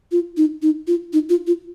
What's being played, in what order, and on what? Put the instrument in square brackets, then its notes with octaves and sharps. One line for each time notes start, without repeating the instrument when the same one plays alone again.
[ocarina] F4
D#4
D#4
F4
D#4
F4
F4